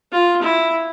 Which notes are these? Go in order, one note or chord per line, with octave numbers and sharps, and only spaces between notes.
F4
E4